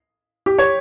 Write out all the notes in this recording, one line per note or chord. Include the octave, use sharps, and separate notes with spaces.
G4
C#5